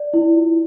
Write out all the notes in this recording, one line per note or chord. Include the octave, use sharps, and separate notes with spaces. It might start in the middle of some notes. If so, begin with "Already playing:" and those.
Already playing: D5
E4
F4